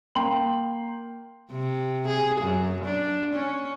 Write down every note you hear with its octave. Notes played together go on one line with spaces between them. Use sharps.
A#3 G5 C6 F#7
C3
G#4
F#2
D4
C#4